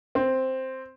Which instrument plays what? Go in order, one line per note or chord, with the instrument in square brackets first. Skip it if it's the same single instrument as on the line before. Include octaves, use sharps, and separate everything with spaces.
[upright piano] C4